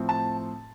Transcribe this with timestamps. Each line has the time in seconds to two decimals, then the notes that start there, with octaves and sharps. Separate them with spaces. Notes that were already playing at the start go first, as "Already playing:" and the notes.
Already playing: A2 F3 C4
0.09 A5